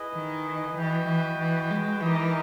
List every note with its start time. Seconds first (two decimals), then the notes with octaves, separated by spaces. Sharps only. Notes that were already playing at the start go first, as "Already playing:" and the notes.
Already playing: E4 G#4 B4 D#5
0.15 D#3
0.77 E3 F#4 B4 D#5 G5
1.08 E3
1.38 E3
1.70 G#3
2.01 E3 D#4 G4 A#4 D#5